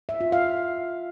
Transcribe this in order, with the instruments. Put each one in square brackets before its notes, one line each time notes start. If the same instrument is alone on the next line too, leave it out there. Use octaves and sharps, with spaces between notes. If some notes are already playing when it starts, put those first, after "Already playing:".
[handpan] E5
F4
F5